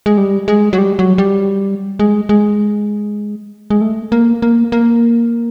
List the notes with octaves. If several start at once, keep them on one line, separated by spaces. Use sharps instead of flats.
G#3
G3
G#3
F#3
G3
F#3
G3
G#3
G#3
G#3
A3
A#3
A#3
A#3